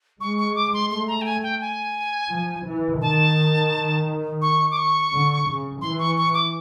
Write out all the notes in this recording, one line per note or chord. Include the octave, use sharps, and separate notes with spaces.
G#3 C#6
C#6
D6
C6
A3 C6
A#5
G5
G#5
G5
G#5
F3
E3
D#3 A5
C#6
D6
C#6
D3
C#3
E3 C6
C#6
C#6
D6